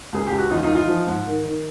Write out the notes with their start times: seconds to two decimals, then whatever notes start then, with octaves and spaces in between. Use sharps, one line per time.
0.13 C#2 G#4
0.27 C#2 G4
0.38 F#4
0.50 E2 D#4 F4
0.63 D#4 F4
0.69 E3
0.75 D#4 F4
0.88 F3
1.07 G#2
1.27 D#3
1.45 D#3